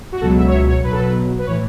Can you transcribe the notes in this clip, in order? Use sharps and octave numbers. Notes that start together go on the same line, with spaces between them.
F#4
C#2 B2 F#3 A4
E5
C#5
E5
C#5
B1 B2 F#3 B4
A4
B4
B4
A2 E3 C#5